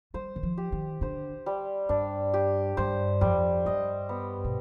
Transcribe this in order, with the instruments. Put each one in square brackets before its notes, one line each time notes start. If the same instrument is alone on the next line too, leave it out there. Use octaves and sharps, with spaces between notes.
[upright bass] G3 [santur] C5
[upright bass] D#3
F3
[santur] G4
[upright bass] D#3
[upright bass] D3 [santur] C5
[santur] G3
[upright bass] G2 [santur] D4
[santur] G4
[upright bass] G2 [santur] C5
[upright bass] F2 [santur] G3
[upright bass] G2 [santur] D#5
[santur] B3
[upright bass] B2